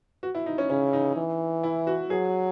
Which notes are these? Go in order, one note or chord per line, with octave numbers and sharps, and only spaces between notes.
F#4
E4
D#4
C#4
C#3 C#4
D#4
E3
E4
F#4
F#3 G#4